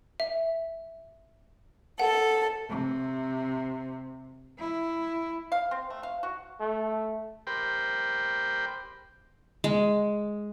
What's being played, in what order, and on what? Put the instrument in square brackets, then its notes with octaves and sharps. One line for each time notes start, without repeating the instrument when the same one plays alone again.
[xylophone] E5
[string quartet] A4 [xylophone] F#5
[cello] C3
E4
[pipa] F5
C4
A3
F5
F#4
[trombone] A3
[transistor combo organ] G4 A#4 C5 G5 B5
[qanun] G#3